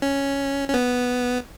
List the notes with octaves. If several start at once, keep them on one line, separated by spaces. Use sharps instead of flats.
C#4
C#4
B3